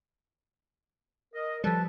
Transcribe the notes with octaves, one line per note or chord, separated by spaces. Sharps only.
A#4 D#5
F3 G3 A4 B4 A5